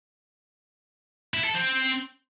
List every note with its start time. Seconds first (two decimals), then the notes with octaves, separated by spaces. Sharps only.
1.34 E4
1.44 A4
1.55 C4